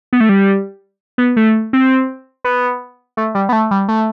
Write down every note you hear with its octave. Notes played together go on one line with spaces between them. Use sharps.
B3
A3
G3
B3
A3
C4
B3
A3
G3
B3
A3
G3
A3